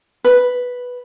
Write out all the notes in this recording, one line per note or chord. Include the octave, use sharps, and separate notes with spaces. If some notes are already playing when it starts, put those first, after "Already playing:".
B4